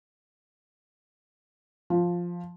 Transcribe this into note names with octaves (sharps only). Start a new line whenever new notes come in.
F3